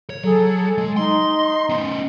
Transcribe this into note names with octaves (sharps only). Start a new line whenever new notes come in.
C#5
F#3 G#4 A4
G#3
D#4 D#5 C6
B3 C#4